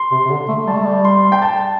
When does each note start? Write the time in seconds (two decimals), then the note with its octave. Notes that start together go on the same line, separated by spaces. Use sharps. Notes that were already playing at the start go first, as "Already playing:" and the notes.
Already playing: C6
0.12 C3
0.25 C3
0.30 D3
0.49 A3
0.67 G3 A5
0.77 A3
0.86 G3
1.05 C6
1.32 G5
1.42 A5